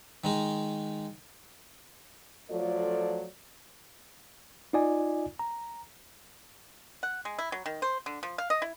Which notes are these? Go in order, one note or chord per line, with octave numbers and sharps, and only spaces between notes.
D#3 G#3 D#4
F3 F#3 A3 F4 A4 D5
D#4 F4 D5 D#5 G#5
A#5
F#5
G#3
E4
F#3
D#3
C5
D3
F3
F5
D#5
E4